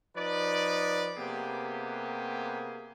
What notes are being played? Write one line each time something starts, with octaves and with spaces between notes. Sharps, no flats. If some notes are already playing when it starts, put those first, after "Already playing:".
F3 D#4 B4 D5
C3 A#3 B3 G4 G#4